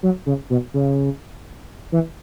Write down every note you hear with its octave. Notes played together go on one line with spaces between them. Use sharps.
F#3
C#3
B2
C#3
E3